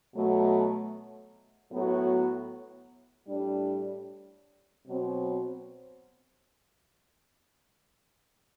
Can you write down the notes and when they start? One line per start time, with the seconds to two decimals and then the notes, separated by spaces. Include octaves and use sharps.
0.13 B2 F#3 A3
1.71 A2 F#3 B3 F#4
3.28 A2 G3 D4
4.85 B2 F#3 C4